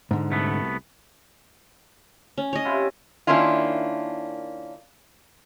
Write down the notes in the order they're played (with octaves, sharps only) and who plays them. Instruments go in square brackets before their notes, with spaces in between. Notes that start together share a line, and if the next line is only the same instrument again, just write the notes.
[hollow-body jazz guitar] G#2 D3
[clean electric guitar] C2 A3 B3
[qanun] C#4
C#5 D#5
[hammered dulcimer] C3 E4 F4
[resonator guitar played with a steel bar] D#3 A#3 C#4 D4 E4 F4